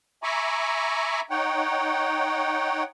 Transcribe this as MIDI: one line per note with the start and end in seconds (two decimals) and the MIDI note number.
0.23 1.21 76
0.23 1.21 80
0.23 1.21 82
0.23 1.21 83
0.23 1.21 85
0.23 1.21 86
1.30 2.84 63
1.30 2.84 73
1.30 2.84 78
1.30 2.84 79